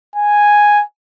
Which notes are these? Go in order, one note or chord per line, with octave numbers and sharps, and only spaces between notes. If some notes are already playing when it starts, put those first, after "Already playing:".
G#5